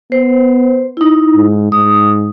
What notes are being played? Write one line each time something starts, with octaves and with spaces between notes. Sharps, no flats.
B3 C5
D#4 E4
G#2
G#2 D#6